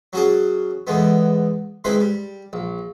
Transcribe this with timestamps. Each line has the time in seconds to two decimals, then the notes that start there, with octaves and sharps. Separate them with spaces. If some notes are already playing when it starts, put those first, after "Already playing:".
0.13 F#3 C#4 F#4 G#4 D5
0.87 E2 D3 G#3 B3
1.84 D#3 G#3 C4 E4 G#4 B4
2.00 G3
2.53 A#1